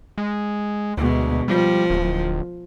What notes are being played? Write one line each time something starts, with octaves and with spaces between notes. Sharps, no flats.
G#3
D2 B2 G#3
F3 G3
D1